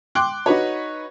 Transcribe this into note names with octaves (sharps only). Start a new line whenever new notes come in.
G5 C6 D6 F#6
D#4 F#4 B4 C#5